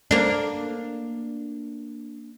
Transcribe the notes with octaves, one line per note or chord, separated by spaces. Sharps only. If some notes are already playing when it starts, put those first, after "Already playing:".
A#3 D4